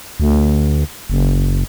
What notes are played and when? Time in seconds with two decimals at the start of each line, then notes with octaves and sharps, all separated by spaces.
0.20 D2
1.10 F#1